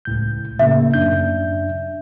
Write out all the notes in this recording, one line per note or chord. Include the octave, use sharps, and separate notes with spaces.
C#2 A2 G6
A2 C#3 A#3 E5
F#2 D4 G6